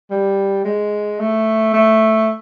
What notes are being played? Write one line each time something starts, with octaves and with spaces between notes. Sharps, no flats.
G3
G#3
A3
A3